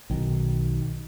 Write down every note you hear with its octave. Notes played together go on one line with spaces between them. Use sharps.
B1 D#3